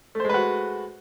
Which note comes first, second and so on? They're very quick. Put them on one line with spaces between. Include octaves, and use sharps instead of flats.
A3 C5 G#3 B4 F#4